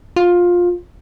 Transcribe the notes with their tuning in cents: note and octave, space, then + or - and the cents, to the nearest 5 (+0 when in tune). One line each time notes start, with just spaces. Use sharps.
F4 +15